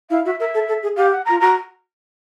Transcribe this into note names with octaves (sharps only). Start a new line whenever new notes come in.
E4 F5
F#4 E5
A#4 E5
A4
A4
G#4
G4 F5
F#5
F4 A#5
F#4 A#5